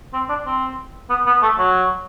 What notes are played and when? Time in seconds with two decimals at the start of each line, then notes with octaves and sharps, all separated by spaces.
0.13 C4
0.29 D4
0.46 C4
1.10 B3
1.26 B3
1.42 A3
1.59 F#3